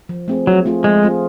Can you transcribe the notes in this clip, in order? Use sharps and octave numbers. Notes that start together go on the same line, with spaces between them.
F3
A3 C4 F4 G#4
F3 F#3
A3 C4 F4 G#4
F3 G#3
A3 C4 F4 G#4